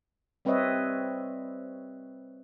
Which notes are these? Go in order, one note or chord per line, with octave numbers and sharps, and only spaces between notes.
G3 C4 B4 C#5 D#5 E5